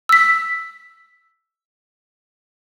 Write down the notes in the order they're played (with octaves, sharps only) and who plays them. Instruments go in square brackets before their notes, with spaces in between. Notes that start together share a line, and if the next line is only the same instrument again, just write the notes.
[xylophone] E6 B6